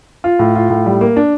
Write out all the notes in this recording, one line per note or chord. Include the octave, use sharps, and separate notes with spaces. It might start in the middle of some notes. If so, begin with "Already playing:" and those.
F4
A2
F4
A2
G3
A#3
D4